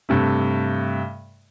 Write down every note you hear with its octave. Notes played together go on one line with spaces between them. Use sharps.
G2 C3 A3